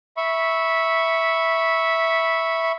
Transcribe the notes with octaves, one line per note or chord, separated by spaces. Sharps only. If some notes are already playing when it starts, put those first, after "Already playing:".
E5 B5 C#6